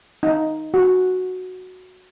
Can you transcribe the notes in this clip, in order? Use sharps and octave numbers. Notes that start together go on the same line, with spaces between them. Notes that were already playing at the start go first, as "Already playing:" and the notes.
D#4
F#4